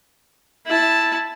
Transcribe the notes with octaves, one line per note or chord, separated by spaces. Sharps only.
E4 A5